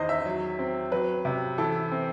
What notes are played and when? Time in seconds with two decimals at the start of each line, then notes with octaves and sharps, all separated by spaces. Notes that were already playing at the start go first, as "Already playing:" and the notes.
Already playing: E2 D#3 C5 D#5
0.09 E5
0.25 F#3
0.59 C4
0.92 F#3 B4
1.25 C3
1.58 E3 A4
1.92 C4